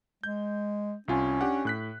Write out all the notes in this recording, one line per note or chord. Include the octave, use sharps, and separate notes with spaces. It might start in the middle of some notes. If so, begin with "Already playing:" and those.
G#3 G6
C2 C#4 F4 G#5
D4 G4 F#5
A2 F#6 B6